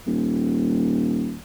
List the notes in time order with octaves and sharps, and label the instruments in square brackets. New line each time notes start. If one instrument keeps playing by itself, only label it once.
[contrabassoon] D#1